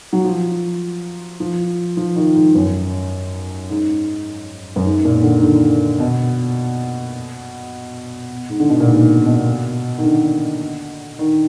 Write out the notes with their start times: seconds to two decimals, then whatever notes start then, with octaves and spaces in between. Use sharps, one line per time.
0.13 F#3
0.24 F3
1.40 F3
1.97 F3
2.16 D#3
2.35 G#2
2.55 F#2
3.69 G#2
4.76 F#2
4.84 G#2
5.05 A#2
5.23 D3
5.38 D#3
5.42 D3
6.00 B2
8.49 G#2
8.60 D3
8.69 B2
8.80 A#2
8.88 G#2
9.26 B2
9.98 D#3
10.04 D3
11.19 D#3